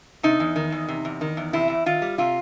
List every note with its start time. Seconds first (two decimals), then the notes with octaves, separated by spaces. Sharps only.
0.23 C3 D#4
0.40 E2
0.56 D#3
0.72 E2
0.88 C3
1.05 E2
1.21 D#3
1.37 E2
1.53 C3 E4
1.70 E2
1.86 D#3 F4
2.02 G3
2.18 C3 F4